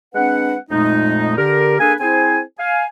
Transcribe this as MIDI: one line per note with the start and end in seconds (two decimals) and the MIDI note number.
0.14 0.55 56
0.14 0.55 60
0.14 0.55 62
0.14 0.55 71
0.14 0.55 78
0.70 1.34 41
0.70 1.34 46
0.70 1.34 56
0.70 1.34 57
0.70 1.34 63
1.37 1.76 50
1.37 1.76 67
1.37 1.76 70
1.79 1.94 58
1.79 1.94 62
1.79 1.94 68
1.79 1.94 69
1.79 1.94 71
1.79 1.94 80
2.00 2.40 60
2.00 2.40 64
2.00 2.40 68
2.00 2.40 72
2.00 2.40 80
2.59 2.86 77
2.59 2.86 80